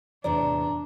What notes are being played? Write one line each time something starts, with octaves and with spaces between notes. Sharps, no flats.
E2 A2 C3 D4 D5 A#5